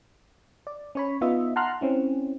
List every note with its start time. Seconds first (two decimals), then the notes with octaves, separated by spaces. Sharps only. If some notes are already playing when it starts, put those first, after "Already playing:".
0.67 D5
0.95 C#4 C#5 B5
1.21 B3 D#4 F4 D#5 E5
1.56 F#5 A5 A#5 C6 F6 F#6
1.81 C4 C#4 E4